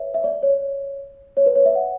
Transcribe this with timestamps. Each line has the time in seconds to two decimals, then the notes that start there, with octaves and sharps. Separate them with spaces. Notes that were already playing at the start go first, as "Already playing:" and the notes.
Already playing: B4 C#5 E5
0.14 E5
0.24 D5
0.43 C#5
1.37 C#5
1.46 B4
1.56 C#5
1.66 E5
1.75 F#5